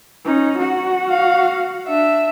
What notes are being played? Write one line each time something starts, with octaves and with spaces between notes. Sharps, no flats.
C#4 D#4
F#4 F#5
F5
D4 E5